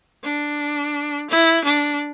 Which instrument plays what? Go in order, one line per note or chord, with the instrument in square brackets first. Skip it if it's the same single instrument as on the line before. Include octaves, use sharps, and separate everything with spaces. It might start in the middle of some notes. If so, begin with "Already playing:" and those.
[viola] D4
E4
D4